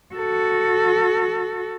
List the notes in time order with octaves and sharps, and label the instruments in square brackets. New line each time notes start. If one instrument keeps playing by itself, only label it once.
[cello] F#4 A4